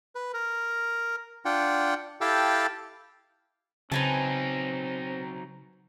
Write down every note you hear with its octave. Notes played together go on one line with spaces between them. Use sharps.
B4
A#4
D4 F4 F#5 G5
E4 G4 A4 F5 G5 A5
C#3 F#3 C4 D#4 B4 G#5 A5